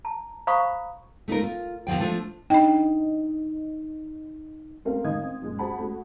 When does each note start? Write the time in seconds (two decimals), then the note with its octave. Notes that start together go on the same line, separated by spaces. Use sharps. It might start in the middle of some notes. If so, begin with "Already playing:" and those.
0.05 A5 A#5
0.47 C5 F5 A#5 B5 C#6 D#6
1.28 A3 D#4 F4 A#4
1.43 F4
1.87 D#2 E3 F3 G5
2.00 F3 A3 D4 F4
2.50 D4 D#4 G5
4.85 A3 C4 A#4 F5
5.04 A2 D#3 D#5 F5 D#6 G#6
5.24 C4
5.42 F#1 A#2 G#3
5.59 F#4 G#4 C5 F#5 A5 B5
5.79 A3 F#4